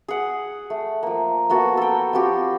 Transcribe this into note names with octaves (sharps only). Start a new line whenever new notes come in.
G#4 F#5
A3
F3 A#3
A#3 B3 F#4 A4
A4 G5
F3 C4 F#4 G4